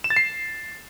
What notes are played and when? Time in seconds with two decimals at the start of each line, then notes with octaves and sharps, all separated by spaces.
0.04 E7
0.10 A6
0.16 C7